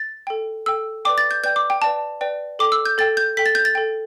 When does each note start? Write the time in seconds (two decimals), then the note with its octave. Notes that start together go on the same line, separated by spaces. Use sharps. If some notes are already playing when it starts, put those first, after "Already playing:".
Already playing: A6
0.27 A4 G5
0.66 A4 G5 E6
1.05 B4 D5 G5 D6
1.18 A6
1.31 G6
1.43 B4 D5 G5 G6
1.56 D6
1.70 G5
1.82 B4 D5 G5 A5
2.21 B4 D5 G5
2.59 A4 G5 D6
2.72 E6
2.85 G6
2.98 A4 G5 A6
3.17 G6
3.37 A4 G5 B6
3.46 A6
3.55 G6
3.65 A6
3.75 A4 G5